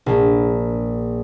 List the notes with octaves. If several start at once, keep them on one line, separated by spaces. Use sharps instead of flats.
A#1